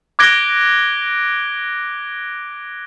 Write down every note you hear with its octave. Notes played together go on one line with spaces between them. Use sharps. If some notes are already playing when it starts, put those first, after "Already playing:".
D6 F#6 G#6 A#6 D7 G7